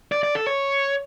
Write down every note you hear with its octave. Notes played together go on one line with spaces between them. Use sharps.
D5
D5
A4
C#5